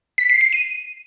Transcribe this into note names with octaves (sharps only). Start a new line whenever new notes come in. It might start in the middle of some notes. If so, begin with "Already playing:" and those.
B6
C7
C7
D#7